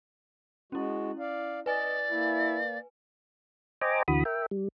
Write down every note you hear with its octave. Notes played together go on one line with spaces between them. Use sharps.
G#3 C#4 E4 F#4
D5 F5
B4 D5 D#5 G#5
A#3 E4
C5 D#5 G5 G#5 A#5 D6
D2 D3 E3 F#4 B5 D#6
A#4 E5 G5
G3